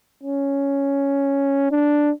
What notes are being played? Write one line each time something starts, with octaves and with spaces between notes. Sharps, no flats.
C#4
D4